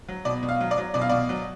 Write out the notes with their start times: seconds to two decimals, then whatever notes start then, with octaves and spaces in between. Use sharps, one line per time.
0.08 F#3
0.25 B2 D5
0.43 B2
0.49 F5
0.60 F#3
0.71 D5
0.78 F#3
0.94 B2 D5
1.01 F5
1.09 B2 D5
1.29 F#3